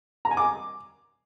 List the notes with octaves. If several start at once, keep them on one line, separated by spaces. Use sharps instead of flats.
A#5
G#5
D6